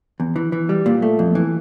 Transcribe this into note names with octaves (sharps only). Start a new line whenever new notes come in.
E2
E3
E3
G3
A#2
A3
F2
E3